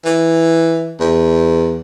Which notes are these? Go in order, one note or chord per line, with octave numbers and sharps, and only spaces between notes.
E3
E2